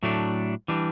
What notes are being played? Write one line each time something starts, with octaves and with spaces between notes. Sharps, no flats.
A2 F#3 A3 D4
E3 G3 D4